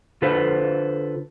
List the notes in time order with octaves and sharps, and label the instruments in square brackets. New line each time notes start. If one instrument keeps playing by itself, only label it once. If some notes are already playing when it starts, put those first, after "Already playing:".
[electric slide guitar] D3 F4 A4 B4 C5